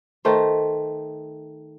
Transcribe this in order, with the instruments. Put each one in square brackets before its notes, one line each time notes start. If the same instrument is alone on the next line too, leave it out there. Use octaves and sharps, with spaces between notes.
[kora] D#3 A3 C5